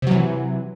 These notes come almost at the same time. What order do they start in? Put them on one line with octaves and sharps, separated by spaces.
C3 F#3 E3